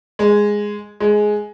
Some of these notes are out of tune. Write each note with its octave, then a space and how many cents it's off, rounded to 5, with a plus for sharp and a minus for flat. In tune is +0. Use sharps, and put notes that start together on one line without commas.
G#3 -5
G#3 +10